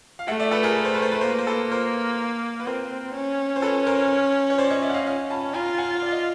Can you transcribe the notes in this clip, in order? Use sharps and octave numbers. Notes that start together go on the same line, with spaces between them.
F5
A3 E5 F#5
D5 E5
A4 B4
G#4 A#4
B4
C5
B4
C5
B4
A#3 C5
B4
C5
A4 B4
A#4 C5
B4
C4 A#4 C5
C#4
C5
A4 B4
A#4 C5
C#5
C5 D5
C#5 D#5
D5 E5
F#5
D#5 F5
C#4 D#5 F5
A5 B5
F4 G#5 A#5
F#5 G#5
D5
D#5